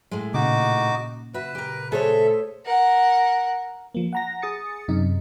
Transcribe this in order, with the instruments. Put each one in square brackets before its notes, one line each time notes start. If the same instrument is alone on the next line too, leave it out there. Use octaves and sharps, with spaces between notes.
[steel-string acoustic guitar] A2 G#3
[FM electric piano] A#2 C#3 [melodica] D#4 F#4 D6
[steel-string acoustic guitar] F#4 E5 [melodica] B4
[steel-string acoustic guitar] G4 A#4
[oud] A3 [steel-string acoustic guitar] G#4 C5 C#5 [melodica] A4 E5
[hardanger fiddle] A#4 F#5
[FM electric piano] F3 A#3
F#5 A#5 A#6
G#4 D#6 A6 C#7
F#2 C3 D#4